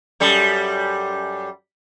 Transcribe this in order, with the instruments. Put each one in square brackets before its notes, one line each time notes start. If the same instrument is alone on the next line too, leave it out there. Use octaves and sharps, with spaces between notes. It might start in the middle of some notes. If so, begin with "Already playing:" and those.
[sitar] F#2 G3 A4